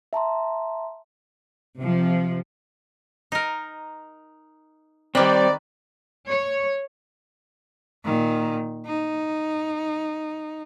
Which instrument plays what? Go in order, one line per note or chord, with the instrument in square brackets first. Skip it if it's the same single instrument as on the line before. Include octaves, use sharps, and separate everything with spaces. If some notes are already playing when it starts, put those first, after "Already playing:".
[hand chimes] E5 A5 A#5 C6
[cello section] C3 F3
[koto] D#4 A#4
[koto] D#3 B4 [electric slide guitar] G3 C4 [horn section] D5
[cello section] C#5
[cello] A#2 D#3
D#4